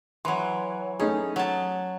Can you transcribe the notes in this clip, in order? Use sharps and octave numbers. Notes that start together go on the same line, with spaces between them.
E3 F#3 C6
A3 C#4 D#4 G#4
F#3 A5